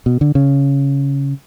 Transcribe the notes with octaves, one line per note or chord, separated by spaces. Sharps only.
B2
D3
C#3